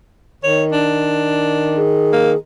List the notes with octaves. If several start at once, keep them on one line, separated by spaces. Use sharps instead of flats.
D#3 C#5
D4
G#4
A#3